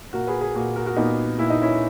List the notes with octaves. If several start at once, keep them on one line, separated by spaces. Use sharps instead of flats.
A#2 F#4 A#4
G#4 B4
G#4 B4
A#2 F#4 A#4
F#4 A#4
F#4 A#4
A#2 B3 D#4
A#2 E4
D#4
C#4 E4